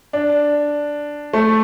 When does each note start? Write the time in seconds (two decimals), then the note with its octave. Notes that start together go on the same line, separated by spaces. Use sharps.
0.13 D4
1.33 A3